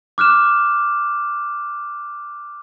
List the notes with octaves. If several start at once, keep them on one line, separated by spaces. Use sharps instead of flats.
D6 F6 F#6 E7